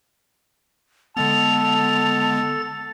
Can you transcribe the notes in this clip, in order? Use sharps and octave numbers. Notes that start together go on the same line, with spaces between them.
D3 G#3 B3 A4 A5 A6 F7